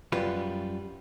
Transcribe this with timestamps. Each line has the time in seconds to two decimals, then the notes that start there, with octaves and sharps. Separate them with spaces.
0.12 F#2 G3 F4 B4